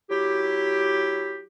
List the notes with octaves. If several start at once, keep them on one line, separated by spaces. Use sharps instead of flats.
F#3 E4 G4